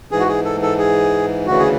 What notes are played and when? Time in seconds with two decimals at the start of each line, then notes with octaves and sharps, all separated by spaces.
0.11 G#2 E3 G#4
0.20 F#4
0.29 G#4
0.45 A4
0.62 A4
0.78 G#4
1.47 D2 C#3 E3 F#4
1.59 G#4